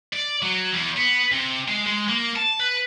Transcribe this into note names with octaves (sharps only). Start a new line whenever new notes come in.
D5
F#3
E2
B3
C3
G#3
G#3
A#3
A5
B4